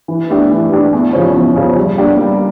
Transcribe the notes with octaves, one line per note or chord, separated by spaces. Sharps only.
E3
A3 D4 G4
E3
A3 D4 G4
E2
C#3 F3 C#4
E2
C#3 F3 C#4
G3
A#3 D4 G4 D5
G3